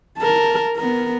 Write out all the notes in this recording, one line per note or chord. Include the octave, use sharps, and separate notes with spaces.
A#4 A5
B3 A#4